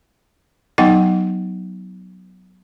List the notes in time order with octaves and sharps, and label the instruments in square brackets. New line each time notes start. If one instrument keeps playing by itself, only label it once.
[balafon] F#3 B3 D#4 D#5 F#5 G5